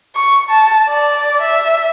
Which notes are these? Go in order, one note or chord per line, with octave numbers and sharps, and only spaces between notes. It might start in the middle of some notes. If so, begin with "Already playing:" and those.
C#6
A5
D5
E5